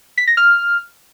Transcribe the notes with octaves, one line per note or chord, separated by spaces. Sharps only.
B6
A#6
F6